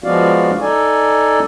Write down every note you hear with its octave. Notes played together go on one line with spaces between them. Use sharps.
F3 G#3 B3 F#4 D5 F5
D#4 A4 D5 G#5